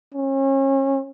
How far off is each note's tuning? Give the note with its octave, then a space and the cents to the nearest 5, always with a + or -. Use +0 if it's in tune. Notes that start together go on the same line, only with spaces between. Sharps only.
C#4 -35